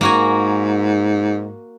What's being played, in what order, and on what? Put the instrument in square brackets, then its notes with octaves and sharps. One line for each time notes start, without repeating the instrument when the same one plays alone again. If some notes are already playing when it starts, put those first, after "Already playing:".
[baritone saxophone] G#2 [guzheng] A#3 F#4 G#5